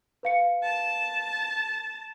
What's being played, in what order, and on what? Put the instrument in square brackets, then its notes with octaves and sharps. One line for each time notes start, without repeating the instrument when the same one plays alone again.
[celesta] B4 F5 C#7
[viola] A5